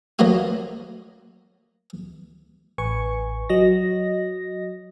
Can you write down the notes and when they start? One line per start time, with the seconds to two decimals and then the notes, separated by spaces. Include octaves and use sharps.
0.19 F#3 A3 A#3 F4 F#4 D#6
2.78 A1 B4 G#5 C#6
3.49 F#3 D#5 A#6